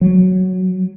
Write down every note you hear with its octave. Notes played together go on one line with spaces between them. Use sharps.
F#3